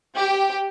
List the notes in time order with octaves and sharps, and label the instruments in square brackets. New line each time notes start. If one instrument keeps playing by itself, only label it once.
[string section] G4